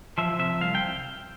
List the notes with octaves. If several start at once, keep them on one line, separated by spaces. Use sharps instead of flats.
F3 E5
C3 E5
C2 F5
G5